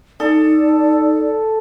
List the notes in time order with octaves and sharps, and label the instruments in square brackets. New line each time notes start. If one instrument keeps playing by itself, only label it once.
[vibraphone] D#4 [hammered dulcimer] A4 [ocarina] D5